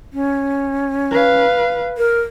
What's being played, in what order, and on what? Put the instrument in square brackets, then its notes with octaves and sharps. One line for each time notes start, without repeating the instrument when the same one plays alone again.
[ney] C#4
[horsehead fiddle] B4 F5
[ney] A#4